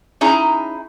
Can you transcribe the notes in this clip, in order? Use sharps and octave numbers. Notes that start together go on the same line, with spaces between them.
C#4 D#4 E4 G#4 A#5